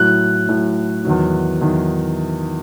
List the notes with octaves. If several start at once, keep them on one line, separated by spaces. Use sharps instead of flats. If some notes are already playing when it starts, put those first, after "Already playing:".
Already playing: A2 F#3 F#6
A2 F#3
E2 D#3 F#3
E2 D#3 F#3